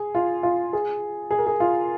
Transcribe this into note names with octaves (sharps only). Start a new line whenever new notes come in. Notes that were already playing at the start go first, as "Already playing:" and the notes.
Already playing: G#4
F4
F4
G#4
G#4
A#4
G#4
F4